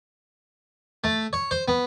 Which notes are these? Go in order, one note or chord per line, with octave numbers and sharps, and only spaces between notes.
A3
C#5
C5
B3